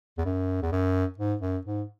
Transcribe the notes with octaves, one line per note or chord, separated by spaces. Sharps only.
E2
F#2
E2
F#2
G#2
F#2
G#2